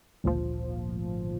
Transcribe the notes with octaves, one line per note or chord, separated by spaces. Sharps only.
G#1 D2 A#2 F3